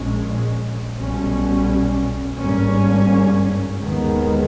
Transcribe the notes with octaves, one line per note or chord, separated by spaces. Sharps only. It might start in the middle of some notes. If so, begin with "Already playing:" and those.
Already playing: A#1 A#2 G#3 C#4
B1 B2 G3 C#4
G#1 G2 G3 A#3 C#4
D#2 D#3 G#3 B3